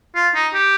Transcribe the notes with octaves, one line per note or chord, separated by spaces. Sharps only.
F4
D#4
G4